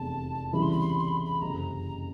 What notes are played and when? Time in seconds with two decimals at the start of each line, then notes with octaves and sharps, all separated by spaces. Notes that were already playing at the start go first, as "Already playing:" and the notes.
Already playing: F1 E2 C3 A5
0.53 C#2 C3 E3 G3 B5
0.62 C6
0.72 B5
0.81 C6
0.90 B5
0.99 C6
1.08 B5
1.17 C6
1.25 B5
1.41 F#1 F2 C3 A#5